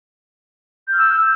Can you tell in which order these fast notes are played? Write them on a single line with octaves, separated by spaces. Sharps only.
G6 F6 E6